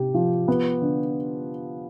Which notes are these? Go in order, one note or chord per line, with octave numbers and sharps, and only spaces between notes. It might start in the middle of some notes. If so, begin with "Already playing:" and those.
Already playing: C3 G4
F3
B3
D3